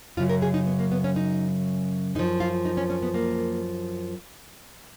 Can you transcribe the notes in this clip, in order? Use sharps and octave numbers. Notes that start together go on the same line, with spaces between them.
F#2 C#3 F#3 F4
A#4
G#4
D#4
B3
A#3
B3
C#4
D#4
F#2 F3 D#4
F4
D#4
C#4
C#4
B3
A#3